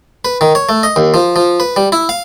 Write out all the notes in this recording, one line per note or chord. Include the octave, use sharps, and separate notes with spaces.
B4
D#3
C#5
A3
D#5
D#2
F3
F3
B4
G3
E4
F5